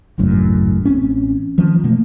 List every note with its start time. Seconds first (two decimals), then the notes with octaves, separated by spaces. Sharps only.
0.18 G#1 C#2 F#2 A2
0.85 A1 C4 C#4
1.58 D#3 F3
1.84 B2 E3 A3 A#3